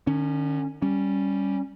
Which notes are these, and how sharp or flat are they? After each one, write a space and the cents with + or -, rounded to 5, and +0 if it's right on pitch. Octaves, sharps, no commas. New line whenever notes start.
D#3 -45 C#4 +0
G3 +0 C#4 +0